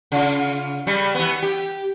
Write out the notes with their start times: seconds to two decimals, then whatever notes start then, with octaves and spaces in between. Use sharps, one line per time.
0.12 C#3 F4
0.87 C#3 G3
1.15 E3 B3
1.43 G4